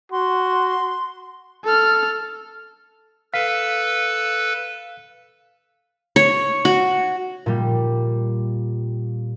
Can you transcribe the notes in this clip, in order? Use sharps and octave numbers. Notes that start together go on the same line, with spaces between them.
F#4 C6
A4 F6
A4 B4 F5 B6
C#5
F#4
A#2 G3